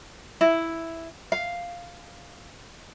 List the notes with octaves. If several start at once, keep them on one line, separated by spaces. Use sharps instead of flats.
E4
F5